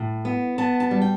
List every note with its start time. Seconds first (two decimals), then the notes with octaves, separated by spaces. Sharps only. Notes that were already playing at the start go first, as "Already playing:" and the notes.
Already playing: A2
0.25 B3
0.58 B3 A5
0.80 A5
0.91 G3
1.01 G5